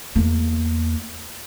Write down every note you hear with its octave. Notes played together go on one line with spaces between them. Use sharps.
E2 A#3